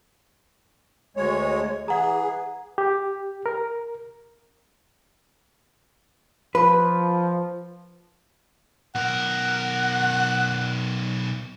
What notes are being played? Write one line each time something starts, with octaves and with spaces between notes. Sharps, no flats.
D2 G#3 C#5
E3 G#4 F#5 A#5
G4
A#4
F3 B4
B1 A#4 F#5